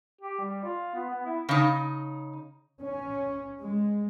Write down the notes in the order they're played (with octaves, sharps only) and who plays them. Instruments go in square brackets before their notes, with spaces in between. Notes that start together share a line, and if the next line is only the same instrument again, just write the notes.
[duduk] G4
G3
F4
B3
B3
E4
[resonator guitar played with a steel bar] C#3 D#4
[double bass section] C#4
G#3